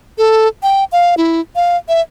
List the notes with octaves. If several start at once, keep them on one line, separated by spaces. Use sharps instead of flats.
A4
G5
F5
E4
F5
E5